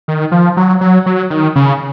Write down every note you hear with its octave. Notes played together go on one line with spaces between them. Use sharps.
D#3
F3
F#3
F#3
F#3
D#3
C#3